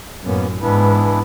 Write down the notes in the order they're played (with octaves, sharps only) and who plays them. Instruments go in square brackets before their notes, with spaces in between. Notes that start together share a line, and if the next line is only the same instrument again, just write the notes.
[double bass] F#2 A2 [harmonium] A#3 B3 C#4
[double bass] G#2 B3 [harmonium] E3 D4 E4